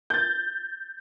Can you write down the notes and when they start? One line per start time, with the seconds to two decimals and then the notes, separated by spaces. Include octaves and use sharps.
0.10 G6 A6